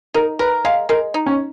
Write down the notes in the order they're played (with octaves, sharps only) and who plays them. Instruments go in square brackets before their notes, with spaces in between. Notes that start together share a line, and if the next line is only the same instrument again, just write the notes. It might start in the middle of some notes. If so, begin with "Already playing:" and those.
[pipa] D#4 [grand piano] A#4
[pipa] A#4 [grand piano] B4
[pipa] G#3 [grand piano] F5
[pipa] G#3 [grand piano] A#4
[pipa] D#4
[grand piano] C#4